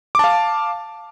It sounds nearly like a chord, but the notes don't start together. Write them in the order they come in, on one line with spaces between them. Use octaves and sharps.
D6 A5 F5